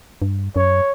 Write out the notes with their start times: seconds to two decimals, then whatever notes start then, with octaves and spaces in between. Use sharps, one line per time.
0.22 G2
0.56 F#2 C#5